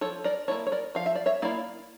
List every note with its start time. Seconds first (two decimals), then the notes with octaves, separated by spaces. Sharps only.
0.01 F3 A4 C#5
0.24 A#4 D5
0.48 A#3 E4 A4 C#5
0.67 C#5
0.72 A#4 D5
0.95 F3 F5
1.06 E5
1.15 D5
1.26 C#5 E5
1.42 A#3 E4 D5 F5